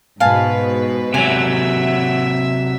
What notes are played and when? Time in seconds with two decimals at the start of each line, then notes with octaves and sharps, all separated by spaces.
0.20 G#2 B2 B4 F5 G#5 A5
1.14 C3 F#3 E5 G#5